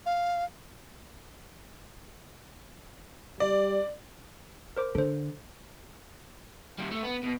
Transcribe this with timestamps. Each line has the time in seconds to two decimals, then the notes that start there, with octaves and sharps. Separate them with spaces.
0.06 F5
3.40 G3 D5
4.76 A#4 C5 D6
4.95 D3 A4 C5
6.78 D#2 G3
6.91 A3
7.03 B3
7.23 B2